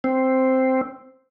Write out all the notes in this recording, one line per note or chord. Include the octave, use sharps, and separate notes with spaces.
C4